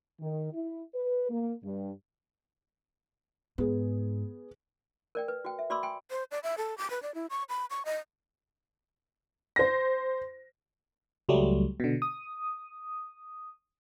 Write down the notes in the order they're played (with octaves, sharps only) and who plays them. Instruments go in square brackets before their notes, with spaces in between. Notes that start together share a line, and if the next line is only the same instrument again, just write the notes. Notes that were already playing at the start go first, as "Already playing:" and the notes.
[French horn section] D#3
E4
B4
A#3
G2
[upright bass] G#2 [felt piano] B3 G#4
[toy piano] A#4 D5 G5
B4
F#4 G5
E5
F#4 D5 B5 C6 D6 E6
G5 G#5 B5 C6
[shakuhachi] C5
D5
E5
A4
D6
B4
D5
E4
C#6
B5
C#6
D#5
[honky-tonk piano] C5 A#6
[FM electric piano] C#2 F#3 G3 A3
B2 D3
D#6